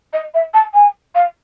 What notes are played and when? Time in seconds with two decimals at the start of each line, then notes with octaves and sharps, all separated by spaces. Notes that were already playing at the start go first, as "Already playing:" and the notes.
0.13 D#5
0.34 E5
0.54 A5
0.74 G#5
1.15 F5